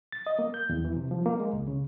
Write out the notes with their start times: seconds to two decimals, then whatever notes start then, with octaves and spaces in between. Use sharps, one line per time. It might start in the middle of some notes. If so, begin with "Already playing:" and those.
0.12 A6
0.27 D#5
0.39 A#3
0.54 G6
0.69 E2
0.85 E3
0.96 C3
1.11 F3
1.26 A#3
1.40 G#3
1.53 C#2
1.68 C#3